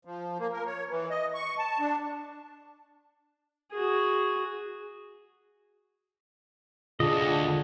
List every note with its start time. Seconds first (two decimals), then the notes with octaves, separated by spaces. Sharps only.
0.05 F3
0.39 A#3
0.52 A#4
0.66 C#5
0.89 E3
1.10 D#5
1.34 C#6
1.58 A5
1.79 D4
3.72 F#4 G#4
7.00 D2 D4 F4 G#4 D#5